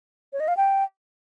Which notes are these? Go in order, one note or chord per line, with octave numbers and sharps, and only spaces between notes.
C#5
D#5
F5
G5